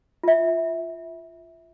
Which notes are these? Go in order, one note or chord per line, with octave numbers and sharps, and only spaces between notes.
F4 E5